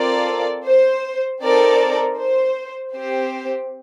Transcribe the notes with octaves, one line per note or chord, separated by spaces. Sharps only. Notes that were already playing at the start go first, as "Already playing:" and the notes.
Already playing: C4 F4 A4 A#4 D5
C5
C4 D#4 A4 A#4 D5
C5
C4 G4 C5